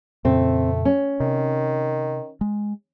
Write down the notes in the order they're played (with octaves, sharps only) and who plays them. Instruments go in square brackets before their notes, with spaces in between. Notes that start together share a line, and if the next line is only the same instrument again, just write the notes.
[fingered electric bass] F2 A#2 C#3 [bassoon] A3 [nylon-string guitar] C4
[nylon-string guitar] C#4
[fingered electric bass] C3 [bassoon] D#3
[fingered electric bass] G#3